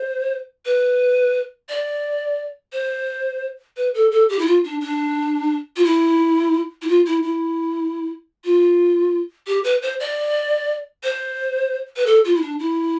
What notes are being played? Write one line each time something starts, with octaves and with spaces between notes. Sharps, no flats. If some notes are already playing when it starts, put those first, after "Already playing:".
Already playing: C5
B4
D5
C5
B4
A4
A4
G4
E4
F4
D4
D4
F4
E4
E4
F4
E4
E4
F4
G4
B4
C5
D5
C5
B4
A4
F4
E4
D4
E4